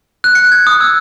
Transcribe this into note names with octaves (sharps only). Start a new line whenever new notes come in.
F#6
C#7
G#6
D#6
E6